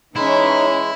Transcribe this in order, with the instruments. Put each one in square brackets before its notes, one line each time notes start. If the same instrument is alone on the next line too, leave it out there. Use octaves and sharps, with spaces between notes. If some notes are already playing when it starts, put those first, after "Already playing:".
[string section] E3 C#4 [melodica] G#3 [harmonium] D#4 [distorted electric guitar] E4